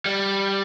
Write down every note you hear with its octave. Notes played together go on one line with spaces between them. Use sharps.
G3